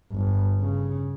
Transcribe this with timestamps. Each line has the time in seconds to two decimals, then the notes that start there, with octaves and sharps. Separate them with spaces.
0.11 G1
0.61 C#3